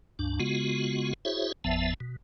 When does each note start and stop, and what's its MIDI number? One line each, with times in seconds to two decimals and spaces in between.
0.19 0.39 37
0.19 0.39 43
0.19 0.39 62
0.40 1.13 49
0.40 1.13 56
0.40 1.13 59
0.40 1.13 65
0.40 1.13 66
1.25 1.52 64
1.25 1.52 66
1.25 1.52 68
1.25 1.52 72
1.25 1.52 73
1.25 1.52 76
1.64 1.94 31
1.64 1.94 40
1.64 1.94 53
1.64 1.94 59
1.64 1.94 76
1.64 1.94 81
2.00 2.16 47